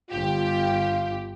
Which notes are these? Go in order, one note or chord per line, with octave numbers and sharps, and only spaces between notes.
G1 F4 G4